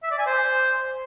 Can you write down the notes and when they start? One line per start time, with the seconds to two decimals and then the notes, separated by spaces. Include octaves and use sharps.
0.03 E5
0.11 D5
0.19 G#5
0.27 C5